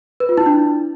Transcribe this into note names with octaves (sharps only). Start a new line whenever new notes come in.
B4
F4
E4
D4